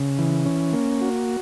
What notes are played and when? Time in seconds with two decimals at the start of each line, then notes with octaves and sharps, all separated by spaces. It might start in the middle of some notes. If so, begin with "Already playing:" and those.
Already playing: C#3
0.19 E3
0.46 C#4
0.73 A#3
1.01 F#4